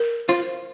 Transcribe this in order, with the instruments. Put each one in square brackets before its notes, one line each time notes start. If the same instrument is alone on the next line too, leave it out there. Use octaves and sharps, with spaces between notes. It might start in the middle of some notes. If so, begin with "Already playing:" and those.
Already playing: [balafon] A#4
[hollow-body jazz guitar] F4 [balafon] C5